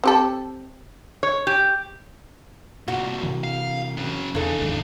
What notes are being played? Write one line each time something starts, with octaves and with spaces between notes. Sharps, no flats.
C4 G4 A4
C#5
G4
C2 A#2 F#4
C3 E3
F5
C#3 F#3
E2 C#3 D4 D#4 A4
E1 D#2 G#2